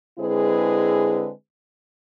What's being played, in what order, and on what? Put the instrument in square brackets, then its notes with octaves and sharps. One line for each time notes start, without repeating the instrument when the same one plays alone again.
[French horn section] D3 G#3 C4 E4 G#4 B4